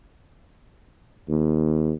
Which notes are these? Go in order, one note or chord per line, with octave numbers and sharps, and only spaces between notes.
D#2